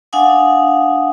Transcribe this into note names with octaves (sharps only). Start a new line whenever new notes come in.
D4 F5 F#5 G#5 D#6